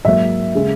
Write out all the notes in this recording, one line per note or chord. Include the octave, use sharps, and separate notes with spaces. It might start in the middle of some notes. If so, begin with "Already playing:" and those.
G#2 F#3 A#3 E5
C#3 G#3